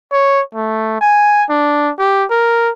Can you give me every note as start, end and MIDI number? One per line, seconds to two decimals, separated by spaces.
0.12 0.42 73
0.55 0.97 57
1.01 1.44 80
1.49 1.91 62
1.99 2.25 67
2.31 2.71 70